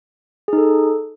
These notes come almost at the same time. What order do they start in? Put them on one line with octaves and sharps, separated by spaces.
G#4 D#4 A4